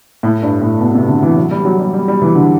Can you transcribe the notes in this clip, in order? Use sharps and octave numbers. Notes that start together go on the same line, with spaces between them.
A2
G2
A2
B2
C3
D3
E3
F#3
G3
F#3
G3
G3
G3
E3
D3